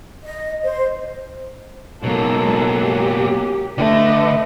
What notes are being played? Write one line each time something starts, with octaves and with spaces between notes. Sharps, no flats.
D#5
C5
B2 F#3 G#3 A#3 D#4 A4
G4
D3 A3 B4 D#5